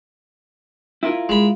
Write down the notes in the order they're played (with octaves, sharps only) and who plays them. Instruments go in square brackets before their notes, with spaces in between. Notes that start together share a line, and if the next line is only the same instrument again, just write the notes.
[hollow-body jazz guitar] E4 F4 A#4
[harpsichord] G#3 B5